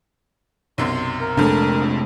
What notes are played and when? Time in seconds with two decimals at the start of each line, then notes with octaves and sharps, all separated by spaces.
0.78 B1 F#2 C3 C6
1.20 A#4
1.37 A#1 F2 C3 G#3 A3 D4 A4